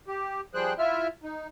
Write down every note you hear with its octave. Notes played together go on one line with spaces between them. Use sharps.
G4
F3 G3 G#4 C5 G5 F#6
E4 F4 E5 F6
D#4